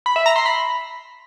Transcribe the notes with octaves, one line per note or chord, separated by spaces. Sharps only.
B5
E5
A#5
C6
B5